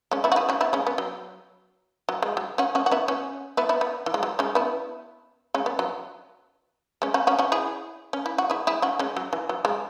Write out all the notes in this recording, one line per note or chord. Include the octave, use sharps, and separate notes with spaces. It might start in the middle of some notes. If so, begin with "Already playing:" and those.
G#3 C#4
B3 E4
F#4
E4 G#4
C#4 F#4
B3 E4
G#3 C#4
B3
F#3
F#3
G#3
F#3
C#4 F#4
C#4 F#4
F#4
B3 E4
C#4 F#4
B3 E4
B3 E4
B3
E3
G#3
F#3
G#3 C#4
B3 E4
G#3 C#4
B3
F#3
G#3 C#4
C#4 F#4
C#4 F#4
C#4 F#4
E4 G#4
C#4
E4
F#4
E4 G#4
E4 G#4
C#4 F#4
G#3 C#4
F#3
E3
F#3
G#3